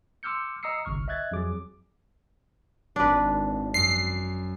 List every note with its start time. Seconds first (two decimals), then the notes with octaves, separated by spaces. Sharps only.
0.23 C6 D6 E6 F6 G6 C#7
0.63 D#5 A#5 D#6 E6 C7 C#7
0.85 G1 C2 C#6 F6
1.08 D#5 E5 F#6 G#6 A6
1.31 F2 F#3 G#4 D6
2.96 G#1 D4 B4
3.74 F#2 C7